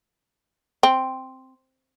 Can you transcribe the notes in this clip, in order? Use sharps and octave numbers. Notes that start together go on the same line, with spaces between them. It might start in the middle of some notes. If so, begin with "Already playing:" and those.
C4